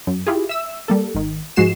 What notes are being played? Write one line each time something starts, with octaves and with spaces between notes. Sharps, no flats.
F#2
E4 F4 G4 G#4
E5 E6
G3 A#3 A4
G#1 D#3
G#2 F3 G#3 F#4 C7 E7